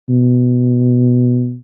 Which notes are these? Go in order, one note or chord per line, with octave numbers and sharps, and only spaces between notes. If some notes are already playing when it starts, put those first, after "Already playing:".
B2